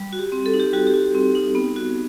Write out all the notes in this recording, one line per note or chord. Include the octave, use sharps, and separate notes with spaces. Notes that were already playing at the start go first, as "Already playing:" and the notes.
Already playing: G3
F#4
G4
C4
A4
D#4
G4
G3 F#4
G4
F#4
C4
D#4
B3
F#4